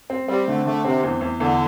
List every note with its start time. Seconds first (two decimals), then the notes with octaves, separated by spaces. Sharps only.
0.10 C4
0.28 G3 C4
0.48 D3 A3
0.66 D3 A3
0.84 C3 C4
1.03 E2
1.21 E2
1.40 E2 D3